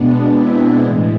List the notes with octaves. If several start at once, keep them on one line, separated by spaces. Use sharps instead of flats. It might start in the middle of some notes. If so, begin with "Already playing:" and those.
Already playing: B2 G#3 B3 D4
C4 E4
A2 E3 G#3